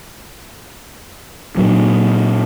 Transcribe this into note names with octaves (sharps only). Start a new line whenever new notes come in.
A#2 F#3